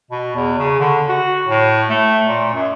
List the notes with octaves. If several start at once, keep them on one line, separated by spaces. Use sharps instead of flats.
B2
E2
C#3
D3
F#4
A2
A3
A#2
F#2